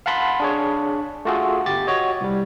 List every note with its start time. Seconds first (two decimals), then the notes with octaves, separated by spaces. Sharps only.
0.06 F5 F#5 A5 B5 C6
0.40 D4 G#4 C#5
1.25 A3 F4 F#4 G#4 A4
1.66 G1 G4 A6
1.87 F#4 C#5 D#5
2.21 C2 G3